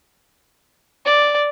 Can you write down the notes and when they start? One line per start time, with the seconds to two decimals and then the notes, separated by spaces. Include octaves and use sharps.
1.06 D5